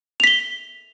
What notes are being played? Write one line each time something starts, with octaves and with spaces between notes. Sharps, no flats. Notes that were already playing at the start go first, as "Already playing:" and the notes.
B6 F7 G7